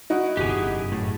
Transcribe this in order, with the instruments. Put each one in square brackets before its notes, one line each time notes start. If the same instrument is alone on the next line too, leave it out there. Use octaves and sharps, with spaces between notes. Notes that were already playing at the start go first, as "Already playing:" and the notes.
[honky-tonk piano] D#4 E4 F#4
[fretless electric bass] G1 E2 C3 [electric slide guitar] G4 G#4
[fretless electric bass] G1 F#2
[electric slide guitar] A2